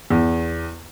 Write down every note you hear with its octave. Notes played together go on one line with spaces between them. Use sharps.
E2